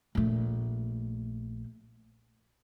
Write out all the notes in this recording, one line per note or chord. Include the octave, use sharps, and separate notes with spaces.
A#1 A3